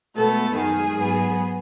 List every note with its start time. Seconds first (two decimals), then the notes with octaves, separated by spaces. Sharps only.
0.16 B2 G#3 A3 B3 A4
0.54 F#2 D#3 G#3 G#4
0.94 G#2 F#3 B3